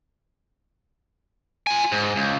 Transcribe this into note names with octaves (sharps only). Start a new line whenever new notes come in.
F4 G#5
G#2
C#2